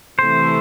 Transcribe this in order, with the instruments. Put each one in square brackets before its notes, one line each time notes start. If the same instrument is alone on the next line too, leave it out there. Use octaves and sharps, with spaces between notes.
[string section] C3 E3 A3 [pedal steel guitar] C5